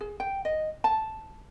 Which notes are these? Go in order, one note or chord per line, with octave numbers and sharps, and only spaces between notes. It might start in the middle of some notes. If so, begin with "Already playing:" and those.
G#4
G5
D#5
A5